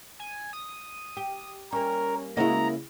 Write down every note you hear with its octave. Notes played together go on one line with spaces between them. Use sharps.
G#5
D#6
G4
G3 A#3 C#4 A#4
C#3 G#3 A#3 E4 F#4 D#5 A#5